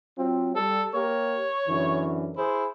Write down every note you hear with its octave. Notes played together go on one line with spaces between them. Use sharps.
F#3 C4 F4
G3 A4
A#3 G4 A#4 C#5
F#2 D3 E3
E4 G#4 C5